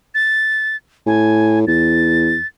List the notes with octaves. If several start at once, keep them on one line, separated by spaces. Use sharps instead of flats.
A6
A2 G#5
E2 A6